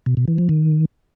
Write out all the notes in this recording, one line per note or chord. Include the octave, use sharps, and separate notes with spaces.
B2
B2
E3
F3
D#3